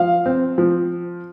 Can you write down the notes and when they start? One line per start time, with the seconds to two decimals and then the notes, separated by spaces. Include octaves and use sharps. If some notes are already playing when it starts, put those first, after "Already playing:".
Already playing: F3 F5
0.26 C4
0.58 F3